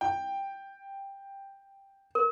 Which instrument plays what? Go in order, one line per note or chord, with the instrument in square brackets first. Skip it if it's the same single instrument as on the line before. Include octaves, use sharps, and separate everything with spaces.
[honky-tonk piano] G5
[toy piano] A#4